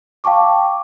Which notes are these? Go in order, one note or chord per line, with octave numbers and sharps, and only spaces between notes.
F5 G5 A5 C#6 D6